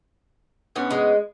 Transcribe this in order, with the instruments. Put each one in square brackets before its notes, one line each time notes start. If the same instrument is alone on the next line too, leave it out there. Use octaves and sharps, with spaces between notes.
[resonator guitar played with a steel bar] G#2 B3 C#4
[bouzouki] G#3